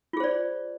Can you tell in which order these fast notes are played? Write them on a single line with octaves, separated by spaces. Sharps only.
F4 G#4 C5 D5